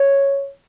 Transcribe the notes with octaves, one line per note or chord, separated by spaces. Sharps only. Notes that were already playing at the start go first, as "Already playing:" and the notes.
Already playing: C#5